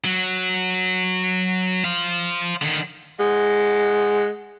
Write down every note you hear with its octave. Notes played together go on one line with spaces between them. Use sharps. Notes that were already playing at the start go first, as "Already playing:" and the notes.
F#3
C5 F5
D3 D#3
G#3 F#5